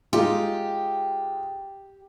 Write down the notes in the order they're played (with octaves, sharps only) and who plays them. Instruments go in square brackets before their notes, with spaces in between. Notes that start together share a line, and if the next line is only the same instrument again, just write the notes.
[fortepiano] G#3 D#4 F4 [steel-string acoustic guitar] G4